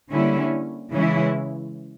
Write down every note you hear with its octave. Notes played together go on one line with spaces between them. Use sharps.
D3 G3 A#3 C#4 E4
C#3 E3 G#3 C#4 E4